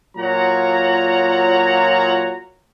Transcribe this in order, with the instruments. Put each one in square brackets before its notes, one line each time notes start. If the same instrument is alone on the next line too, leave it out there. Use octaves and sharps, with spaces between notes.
[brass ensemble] A#2 F#3 F4 C#5 F#5 A#5